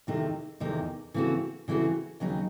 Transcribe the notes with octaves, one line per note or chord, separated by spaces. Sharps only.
E2 C3 D#3 A3 D#4
E2 C3 D#3 A3 D#4
C#3 E3 A3 C4 F#4
C#3 E3 A3 C4 F#4
D#2 C#3 F#3 C4 D#4